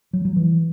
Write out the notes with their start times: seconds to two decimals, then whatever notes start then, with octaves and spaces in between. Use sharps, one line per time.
0.13 F#3
0.25 F#3
0.36 E3